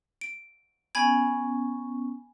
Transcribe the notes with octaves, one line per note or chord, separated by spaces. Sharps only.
D7
B3 C#4 G#5 B5 G#6